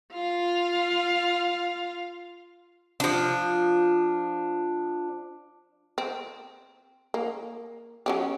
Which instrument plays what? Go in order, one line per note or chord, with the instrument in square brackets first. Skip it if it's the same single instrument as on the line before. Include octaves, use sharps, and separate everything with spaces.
[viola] F4 F5
[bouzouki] F3 D4
[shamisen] C4
A#3
F#3 C#4 G4